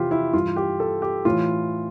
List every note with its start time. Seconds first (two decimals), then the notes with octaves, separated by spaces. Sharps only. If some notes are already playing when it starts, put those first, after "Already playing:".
Already playing: F2 C3 E3 F4 G4
0.11 E4
0.34 G2 E3 F4
0.56 G4
0.80 A4
1.02 G4
1.25 A2 E3 F4